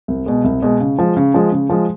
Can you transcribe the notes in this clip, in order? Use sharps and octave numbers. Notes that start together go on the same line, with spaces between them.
C2
B2 G#3
C2
B2 G#3
C#3
F3 G#3
C#3
F3 G#3
C#3
F3 G#3